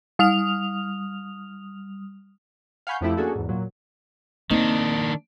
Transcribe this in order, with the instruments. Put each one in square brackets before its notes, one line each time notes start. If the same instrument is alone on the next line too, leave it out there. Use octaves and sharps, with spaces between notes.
[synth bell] G3 D#6 F6 F7
[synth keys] F5 F#5 G#5 B5 C#6 G6
F2 F3 A3 E4 G4
A#3 C#4 D4 F#4 G#4 A4
E2 G#2
A#2 F#3
[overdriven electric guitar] D#3 D4 [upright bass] A#3 [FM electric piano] C4 D#4